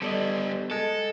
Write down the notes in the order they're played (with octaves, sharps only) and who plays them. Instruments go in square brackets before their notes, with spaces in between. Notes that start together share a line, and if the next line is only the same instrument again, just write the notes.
[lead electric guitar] G3 B3 [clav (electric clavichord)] A4 D5 D#5
[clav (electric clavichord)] G#3 [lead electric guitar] A4